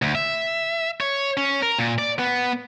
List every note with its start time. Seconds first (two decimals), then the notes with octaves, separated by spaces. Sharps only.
0.02 D2
0.15 E5
1.01 C#5
1.37 C#4
1.62 A#4
1.79 A#2
1.99 D5
2.19 B3